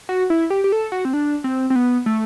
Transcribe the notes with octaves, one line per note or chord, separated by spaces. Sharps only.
F#4
E4
G4
G4
A4
F#4
C4
D4
C4
C4
B3
A3